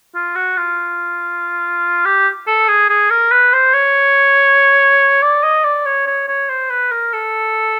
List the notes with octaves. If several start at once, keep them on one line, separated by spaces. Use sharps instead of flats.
F4
F#4
F4
G4
A4
G#4
G#4
A#4
B4
C5
C#5
D5
D#5
D5
C#5
C#5
C#5
C5
B4
A#4
A4